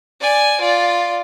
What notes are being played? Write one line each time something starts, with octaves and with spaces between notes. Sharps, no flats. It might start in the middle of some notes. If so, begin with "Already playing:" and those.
D5 G#5
F4 D5